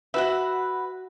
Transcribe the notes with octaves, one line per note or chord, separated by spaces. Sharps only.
F#4 B4 E5 F#5